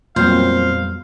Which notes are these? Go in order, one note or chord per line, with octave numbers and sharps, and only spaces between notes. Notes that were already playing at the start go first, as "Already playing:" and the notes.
F2 A#2 F#3 G3 B3 C4 C5 F5